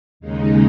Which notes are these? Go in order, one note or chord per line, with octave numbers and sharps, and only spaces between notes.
D#2 C#3 G#3 D#4